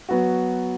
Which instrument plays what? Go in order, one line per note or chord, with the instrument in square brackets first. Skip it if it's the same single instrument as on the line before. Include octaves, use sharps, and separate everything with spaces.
[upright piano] F#3 B3 F#4